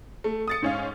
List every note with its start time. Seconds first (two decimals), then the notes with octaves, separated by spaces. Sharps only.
0.24 A3
0.48 D#6 A6 C#7
0.62 G#2 C#4 F5